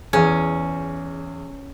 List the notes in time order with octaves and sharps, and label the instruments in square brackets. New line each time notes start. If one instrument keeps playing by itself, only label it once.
[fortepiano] E2 G#4 [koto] C#4